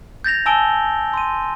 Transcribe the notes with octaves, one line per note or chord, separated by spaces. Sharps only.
G6 A6 A#6 F7
G#5 A5 E6 D7 G7
C6 D#7